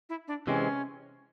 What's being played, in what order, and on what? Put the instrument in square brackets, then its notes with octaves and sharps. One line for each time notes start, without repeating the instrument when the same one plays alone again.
[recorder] E4
D4
[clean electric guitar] C3 E3 G#3 C4 [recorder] C#4